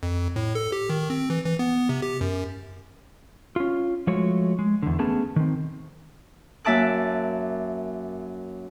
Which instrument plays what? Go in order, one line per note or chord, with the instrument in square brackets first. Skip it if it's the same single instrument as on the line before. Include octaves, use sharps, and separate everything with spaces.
[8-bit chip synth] F2
A2
A4
G4
D#3
C4
E3
E3
B3
C3
G4
F#2
[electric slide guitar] C#4 F4
F3 G#3 A3 F#4 C#5
G#3
E2 D3
A3 B3 C#4 G#4 A5
D#3 C4
[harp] F#2 A#3 E5 A5 D6 F#6